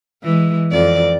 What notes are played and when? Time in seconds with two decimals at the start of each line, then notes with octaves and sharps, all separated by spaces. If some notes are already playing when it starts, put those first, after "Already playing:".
0.23 E3 G#3
0.72 F2 D5